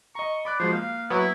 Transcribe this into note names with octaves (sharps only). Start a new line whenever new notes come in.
D#5 A#5 C#6
D5 B5 D6 F#6
F3 G#3 F#4 C5
A#3 F5
F#3 B3 E4